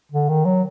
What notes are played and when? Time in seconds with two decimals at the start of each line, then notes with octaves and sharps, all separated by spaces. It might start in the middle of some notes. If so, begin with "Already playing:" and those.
0.12 D3
0.29 D#3
0.45 F#3